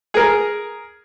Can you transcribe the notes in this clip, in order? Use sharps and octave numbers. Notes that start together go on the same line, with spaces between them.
G#4 A#4